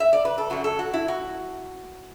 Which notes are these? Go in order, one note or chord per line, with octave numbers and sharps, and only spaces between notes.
E5
D5
B4
A4
F#2 F#3 F#4
A4
F#4
E4
F#4